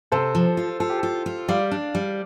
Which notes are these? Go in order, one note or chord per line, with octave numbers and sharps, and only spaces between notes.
C3 A4 C5
F3
F4
F4 A4
G4
F4 A4
F4
G3 D5 F5
D4
G3